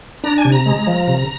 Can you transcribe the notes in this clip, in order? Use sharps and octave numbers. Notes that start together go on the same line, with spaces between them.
D4 A#5
G#5
C3
A#5
G#3
F3
C3